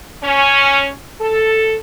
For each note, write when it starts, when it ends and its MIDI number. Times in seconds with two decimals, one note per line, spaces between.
0.24 0.90 61
1.20 1.75 69